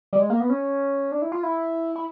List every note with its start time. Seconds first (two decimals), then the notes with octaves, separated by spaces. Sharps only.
0.13 G3
0.19 G#3
0.30 A#3
0.40 B3
0.50 C#4
1.12 D4
1.22 E4
1.32 F4
1.43 E4
1.95 E4